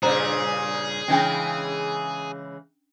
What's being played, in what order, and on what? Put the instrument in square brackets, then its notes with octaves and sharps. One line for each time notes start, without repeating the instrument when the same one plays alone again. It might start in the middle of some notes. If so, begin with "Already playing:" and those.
[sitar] G2 A#2 C#3 [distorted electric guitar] G#4 [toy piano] C5 A#5
[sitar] C#3 E3 G#3 [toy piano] C#4 D4 G5